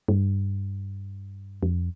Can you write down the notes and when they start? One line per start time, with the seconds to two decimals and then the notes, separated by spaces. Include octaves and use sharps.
0.08 G2
1.63 F2